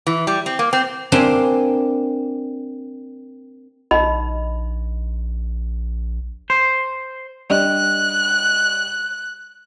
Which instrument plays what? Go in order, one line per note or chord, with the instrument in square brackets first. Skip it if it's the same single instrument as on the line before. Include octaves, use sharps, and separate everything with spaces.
[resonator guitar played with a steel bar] E3
G3
C4
A#3
C4
[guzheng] A#3 C4 D4 G4 C5 G#5
[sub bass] A#1 [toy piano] D#4 D#5 B5
[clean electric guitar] C5
[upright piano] G3 D4 D#5 [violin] F#6